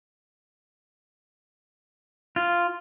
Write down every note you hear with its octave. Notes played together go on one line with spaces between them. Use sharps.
F4